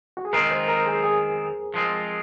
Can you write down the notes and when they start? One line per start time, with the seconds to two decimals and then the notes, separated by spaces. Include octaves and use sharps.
0.17 F#4
0.25 G#4
0.33 D#3 G#3 C4 F4 A#4
0.51 C5
0.68 A#4
0.86 G#4
1.04 G#4
1.74 F3 G#3 C4 F4